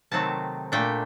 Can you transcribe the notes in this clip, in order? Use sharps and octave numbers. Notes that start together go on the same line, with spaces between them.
C3 D#3 F#3 A3 C4 A5
A#2 A3 D4 G5